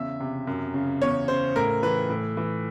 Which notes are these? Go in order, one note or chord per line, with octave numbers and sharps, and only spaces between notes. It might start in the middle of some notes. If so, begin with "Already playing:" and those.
Already playing: E2 C#3 E5
C3
F#2
C#3
E2 C#5
C#3 C5
A2 A#4
E3 B4
A2
E3